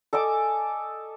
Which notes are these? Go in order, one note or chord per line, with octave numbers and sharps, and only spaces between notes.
A4 D#5 G#5 D6